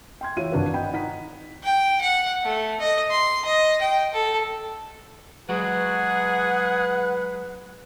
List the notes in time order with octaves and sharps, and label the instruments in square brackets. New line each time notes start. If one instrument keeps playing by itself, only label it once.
[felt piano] G5 C6 G#6
E3 F#4 C#5 E5 F5 D#7
G#1 D4 F#4 B4 F5
D#5 F#5 G5 B5
D#4 F#5 B6
[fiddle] G5
F#5
A3
D#5
C6
D#5
G5
A4
[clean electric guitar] F#3 G#3 F#4 [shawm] G#4 [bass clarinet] B4 [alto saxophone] F#5